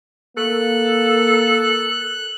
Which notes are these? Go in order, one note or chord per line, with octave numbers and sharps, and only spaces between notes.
A#3 A4 F#6